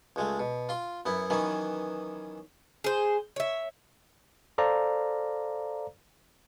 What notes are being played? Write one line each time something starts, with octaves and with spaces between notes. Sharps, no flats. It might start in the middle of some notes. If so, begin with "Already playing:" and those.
C#2 G#3 A3
B2
F4 C6
F#2 B3 E4
D#3 E3 F#3 B3 C#4
G#4 C5
C#5 E5
A4 C5 D5 F5 A#5